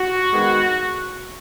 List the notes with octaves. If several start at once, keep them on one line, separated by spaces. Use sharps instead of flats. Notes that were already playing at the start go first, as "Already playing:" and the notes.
Already playing: F#4
D#3 G#3 B3